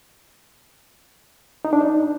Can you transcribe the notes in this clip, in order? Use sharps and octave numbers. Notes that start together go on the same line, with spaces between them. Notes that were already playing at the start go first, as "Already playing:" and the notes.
D#4
D4
D#4